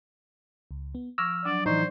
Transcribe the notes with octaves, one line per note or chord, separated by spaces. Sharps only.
C#2
B3
F3 C#6 D6 E6 F6 A#6
F#3 D4 D5 F#5 D#6
A2 E3 D#4 C5 D5 C#6